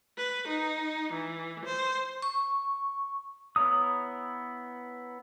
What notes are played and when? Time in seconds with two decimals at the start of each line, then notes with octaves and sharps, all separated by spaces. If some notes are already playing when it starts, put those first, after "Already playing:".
0.17 B4
0.47 D#4
1.13 E3
1.65 C5
2.22 C#6
3.56 B3 E4 C#5 A#5 D#6